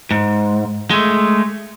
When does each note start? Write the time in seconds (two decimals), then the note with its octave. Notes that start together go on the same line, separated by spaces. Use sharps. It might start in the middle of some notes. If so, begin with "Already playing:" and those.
0.11 G#2
0.90 G#3 A3